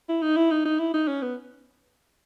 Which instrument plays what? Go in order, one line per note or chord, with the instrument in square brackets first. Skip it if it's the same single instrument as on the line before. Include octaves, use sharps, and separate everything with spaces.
[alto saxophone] E4
D#4
E4
D#4
D#4
E4
D#4
C#4
B3